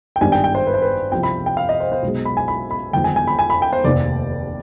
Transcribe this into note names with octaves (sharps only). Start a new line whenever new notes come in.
G5
G#1 G2 D#3 G3 D4 G#5
G5
G5
C5
B4
C5
B4
C2 C3 F3 G5
B5
G5
F5
D#5
C5
C5
B1 B2 G#3
B5
G#5
B5
B5
G1 F2 D#3 G#3 G5
G#5
G#5
B5
G#5
B5
G5
C5
F1 D#2 D#3 D5